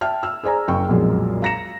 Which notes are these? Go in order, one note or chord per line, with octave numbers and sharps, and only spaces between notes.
E5 G5 A5 F6
E6 F6
G#4 C5 D5 G#5 A#5
F#1 G5 C#6
B1 F2 A#2 F#3 G#3
F5 A#5 A#6 C#7 E7